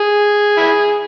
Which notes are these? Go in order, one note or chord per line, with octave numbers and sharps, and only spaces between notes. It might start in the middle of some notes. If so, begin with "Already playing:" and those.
Already playing: G#4
E4